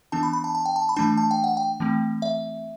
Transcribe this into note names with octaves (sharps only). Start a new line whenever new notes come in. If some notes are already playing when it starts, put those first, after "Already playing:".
E3 B3 D4 A5
B5
B5
A5
A5
G5
A5
B5
E3 A3 D4 A5
A5
G5
F#5
G5
E3 A3 C4
E5